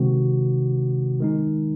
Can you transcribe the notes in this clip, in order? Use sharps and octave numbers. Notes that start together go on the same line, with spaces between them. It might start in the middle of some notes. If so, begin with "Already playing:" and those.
Already playing: C3 D#3 G#3 C4 F#4
D#3 G#3 D#4